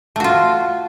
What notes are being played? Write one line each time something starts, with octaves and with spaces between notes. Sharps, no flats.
A3 F4 F#4